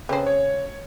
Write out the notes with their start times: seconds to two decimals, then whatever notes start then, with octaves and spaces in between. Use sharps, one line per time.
0.09 C#3 C4 C#4 G#4 A4 B4 C5
0.26 C#5